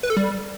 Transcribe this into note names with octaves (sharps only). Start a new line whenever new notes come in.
B4
A4
G3